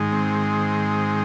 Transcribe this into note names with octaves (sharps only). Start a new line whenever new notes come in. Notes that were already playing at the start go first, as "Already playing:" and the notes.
Already playing: G#2 D#3 G#3
C4